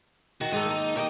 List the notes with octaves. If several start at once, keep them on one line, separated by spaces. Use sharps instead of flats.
D#3 F#4
G#2 D#4 A4
A#3
A#3 G4 C#5 D#5